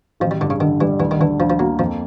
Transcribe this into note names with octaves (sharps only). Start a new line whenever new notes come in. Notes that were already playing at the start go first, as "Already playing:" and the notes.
A1 F3
G3
G2 D3
C#3
D3 D#3
E3 G3
D2 E3
D#3
D3 E3
D2 F3
F3
F#3 A#3
F2 F3